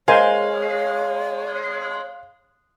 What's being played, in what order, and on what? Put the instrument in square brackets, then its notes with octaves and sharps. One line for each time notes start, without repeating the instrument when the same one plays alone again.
[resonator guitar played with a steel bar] G#3 [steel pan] A#4 C5 G#5 [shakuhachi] C#5 [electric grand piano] F5